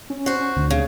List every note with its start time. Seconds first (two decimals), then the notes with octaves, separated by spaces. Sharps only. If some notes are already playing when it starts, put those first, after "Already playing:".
0.10 C#4
0.26 F#4 C5
0.56 D2
0.70 C#3